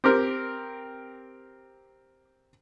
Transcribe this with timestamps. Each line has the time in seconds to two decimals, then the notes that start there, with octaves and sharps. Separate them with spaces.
0.04 C4 G4 A#4